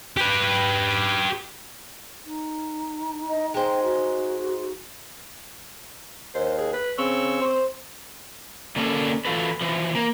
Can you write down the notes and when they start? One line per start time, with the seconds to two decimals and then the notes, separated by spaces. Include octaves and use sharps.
0.17 G4 B4
2.25 D#4
3.28 D#5
3.54 G#3 C5 G5
3.84 F#4
6.34 D#2 C5
6.58 G#4
6.73 B4
6.98 C#3 C4 C#6 E6
7.42 C5
8.76 D3 A#3 C#4 D4 G#4 A4
9.25 E3 G3 F4 A4 B4
9.61 E3 F3
9.95 A#3